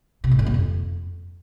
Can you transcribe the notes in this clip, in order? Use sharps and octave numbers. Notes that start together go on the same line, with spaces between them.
C3
A2
A3
A#3
F2